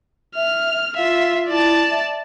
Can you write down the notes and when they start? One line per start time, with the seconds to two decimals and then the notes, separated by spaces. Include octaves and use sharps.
0.36 E5 F6
0.96 F4 E5 F5
1.48 E4 D5 A5
1.91 E5